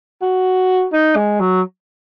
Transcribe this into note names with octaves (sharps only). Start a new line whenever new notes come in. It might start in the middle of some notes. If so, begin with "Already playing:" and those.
F#4
D#4
G#3
F#3